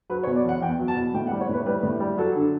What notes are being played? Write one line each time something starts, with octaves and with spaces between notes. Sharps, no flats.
F#3 B4
C#5
B2
D5
E2 F#5
E2 G5
F#3
A5
B2
A2 G5
F#5
G3
C#5
A2 B4
G3 B4
A2
G3
F#3 A4
D3